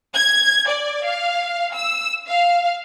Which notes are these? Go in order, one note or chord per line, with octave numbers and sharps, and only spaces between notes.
G#6
D5
F5
E6
F5